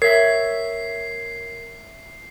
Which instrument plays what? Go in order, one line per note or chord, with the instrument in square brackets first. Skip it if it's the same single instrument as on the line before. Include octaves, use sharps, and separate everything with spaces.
[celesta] A#4 [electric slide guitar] C#5 E5 [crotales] C7